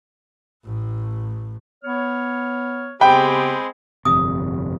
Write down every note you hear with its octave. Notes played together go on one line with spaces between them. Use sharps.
A1 A2
B3 C#5 F6
C#3 G#3 B3 C4 G4 G5 B5
G1 F2 C3 D#6